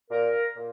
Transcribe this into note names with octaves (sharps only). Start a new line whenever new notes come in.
A#2 A#4
A#2